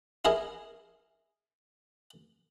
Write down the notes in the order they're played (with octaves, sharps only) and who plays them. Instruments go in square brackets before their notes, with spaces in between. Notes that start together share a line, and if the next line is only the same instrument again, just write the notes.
[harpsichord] E4 G#4 A#4 D#5